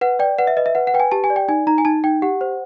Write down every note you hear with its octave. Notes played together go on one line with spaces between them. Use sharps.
B4 F#5
D5 G5
B4 F#5
E5
B4 D#5
E5
B4 F#5
F#5
B4 G5
G#5
G4 A5
G#5
D5
G5
D#4 G#5
D#4 A#5
G#5
D#4 A5
D#4 G5
G4 F#5
C5